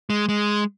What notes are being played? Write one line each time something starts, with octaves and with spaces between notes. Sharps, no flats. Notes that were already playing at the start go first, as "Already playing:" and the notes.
G#3
G#3